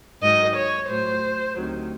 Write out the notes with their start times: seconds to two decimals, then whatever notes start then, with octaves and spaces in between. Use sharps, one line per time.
0.21 G#2 D#3 F#3 D#5
0.54 C#5
0.87 A2 F#3 C5
1.55 D2 C3 D#3 F#3